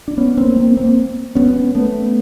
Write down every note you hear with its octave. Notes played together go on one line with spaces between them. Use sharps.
D4
B3 C#4
A#3 C4
A#3 C4
A#3 C4
B3 C#4
A3 B3